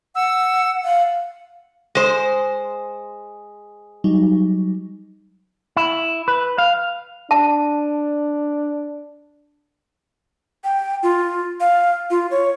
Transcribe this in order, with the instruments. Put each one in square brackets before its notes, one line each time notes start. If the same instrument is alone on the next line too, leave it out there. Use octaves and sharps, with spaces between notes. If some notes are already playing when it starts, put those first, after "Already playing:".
[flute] F#5 [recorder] E6
[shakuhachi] F5 [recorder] F#5
[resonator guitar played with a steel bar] G#3 C5
[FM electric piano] F#3 G3 D#4
[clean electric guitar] E4
B4
F5
[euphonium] D4 [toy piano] A5
[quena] G5
F4
F5
F4
C#5